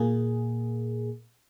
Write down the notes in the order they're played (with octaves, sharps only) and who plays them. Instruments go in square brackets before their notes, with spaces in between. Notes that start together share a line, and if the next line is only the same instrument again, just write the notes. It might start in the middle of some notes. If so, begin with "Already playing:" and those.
Already playing: [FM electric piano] A#2 A#3 G#4